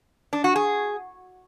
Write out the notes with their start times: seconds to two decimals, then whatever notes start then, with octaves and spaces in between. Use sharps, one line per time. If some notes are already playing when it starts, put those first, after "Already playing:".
0.33 D4
0.44 F#4
0.56 G#4